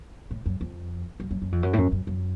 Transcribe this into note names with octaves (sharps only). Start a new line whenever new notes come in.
A2
F#2
F2
F#2
F#2
F#2
F2
F#2
A2
F#2
F#2
F#2